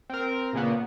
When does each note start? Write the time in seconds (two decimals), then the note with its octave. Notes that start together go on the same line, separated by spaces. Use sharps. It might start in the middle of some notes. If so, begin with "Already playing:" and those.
0.10 C4 A#4
0.53 A#2 C#3 A#3 B3